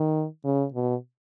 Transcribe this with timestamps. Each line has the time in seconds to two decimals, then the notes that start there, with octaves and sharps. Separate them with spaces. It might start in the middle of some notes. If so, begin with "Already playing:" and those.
Already playing: D#3
0.44 C#3
0.74 B2